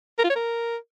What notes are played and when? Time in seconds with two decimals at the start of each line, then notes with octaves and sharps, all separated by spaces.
0.19 A#4
0.24 F4
0.30 C#5
0.35 A#4